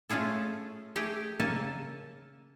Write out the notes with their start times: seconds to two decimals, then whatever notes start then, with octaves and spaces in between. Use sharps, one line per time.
0.09 A3 C#4 F4 G#4 A4
0.96 A3 G4 G#4 G5
1.40 C#3 A#3 A4 G#5 A5